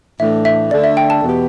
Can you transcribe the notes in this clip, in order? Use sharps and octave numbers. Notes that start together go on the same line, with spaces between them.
A2 E3 A3 D4 E5
E5
D3 A3 D4 A4 D5
E5
G5
A5
E2 B2 B3 G4